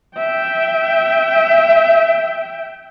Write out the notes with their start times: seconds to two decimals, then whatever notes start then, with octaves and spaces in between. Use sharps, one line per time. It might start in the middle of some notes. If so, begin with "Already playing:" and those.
0.17 E5 G5